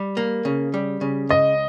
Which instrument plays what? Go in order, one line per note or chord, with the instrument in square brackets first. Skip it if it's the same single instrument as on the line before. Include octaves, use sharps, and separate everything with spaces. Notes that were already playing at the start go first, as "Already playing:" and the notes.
Already playing: [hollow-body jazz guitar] G3
A#3
C#3
G3
C#3
[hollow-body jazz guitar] C#2 [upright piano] D#5